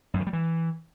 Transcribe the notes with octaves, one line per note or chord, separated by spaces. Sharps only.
F#2
D#3
G3
E3